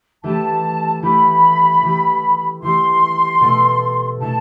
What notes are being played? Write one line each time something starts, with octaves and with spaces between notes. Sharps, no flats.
E3 A3 E4 G4 A5
E3 A3 E4 G4 B5
E3 A3 E4 G4
E3 A3 E4 G4 C6
B2 A3 E4 A4
B2 A3 E4 A4 A5